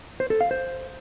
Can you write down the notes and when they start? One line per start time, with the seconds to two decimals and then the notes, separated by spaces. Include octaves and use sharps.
0.20 C5
0.30 A4
0.41 F5
0.51 C5